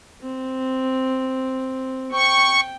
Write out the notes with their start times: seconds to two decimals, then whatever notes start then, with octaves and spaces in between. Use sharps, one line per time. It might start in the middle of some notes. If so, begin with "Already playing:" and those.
0.21 C4
2.12 G5 C#6